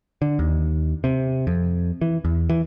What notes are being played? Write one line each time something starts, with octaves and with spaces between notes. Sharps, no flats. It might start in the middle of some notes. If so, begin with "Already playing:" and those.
D3
D#2
C3
F2
E3
E2
E3